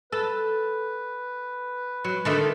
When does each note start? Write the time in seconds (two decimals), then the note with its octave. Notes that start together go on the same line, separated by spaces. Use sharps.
0.12 A4 B4
2.04 F#3
2.25 D3 D#3 A3